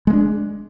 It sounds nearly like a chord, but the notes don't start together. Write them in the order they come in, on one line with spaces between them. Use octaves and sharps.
G#3 A3 D4